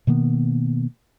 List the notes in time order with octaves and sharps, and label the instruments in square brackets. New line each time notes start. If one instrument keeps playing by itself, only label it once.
[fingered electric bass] B2 D#3 A#3 B3